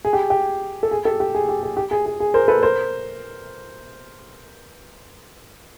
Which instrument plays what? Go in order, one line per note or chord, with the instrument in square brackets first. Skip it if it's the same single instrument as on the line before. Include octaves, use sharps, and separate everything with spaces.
[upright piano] G#4
G4
G4
A4
G#4
G4 A4
G4
G#4
G4
G#4
G4
G#4
G#4
G#4
A#4 C5
A4 B4
A#4 C5